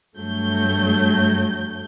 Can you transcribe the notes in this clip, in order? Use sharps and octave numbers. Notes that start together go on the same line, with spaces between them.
G2 F#3 A3 G6